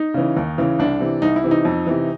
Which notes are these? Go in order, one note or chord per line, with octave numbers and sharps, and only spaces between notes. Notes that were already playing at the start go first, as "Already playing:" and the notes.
Already playing: D#4
C#3 E3
D#2
C#3 E3
C2 D4
C3 E3
C2 D#4
E4
C3 E3
D#4
F2
C3 E3